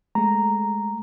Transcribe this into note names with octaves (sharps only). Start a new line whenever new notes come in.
G#3 A3 A#5